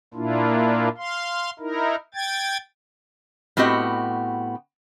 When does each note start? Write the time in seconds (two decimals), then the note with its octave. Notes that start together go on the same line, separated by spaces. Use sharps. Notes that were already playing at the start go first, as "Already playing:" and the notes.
0.14 A#2 A#3 D4 E4 F4
0.98 F5 C6
1.60 D#4 E4 A#4
2.14 G5 G#6 A6
3.57 A2 B3 C4 F#4 G4 D#5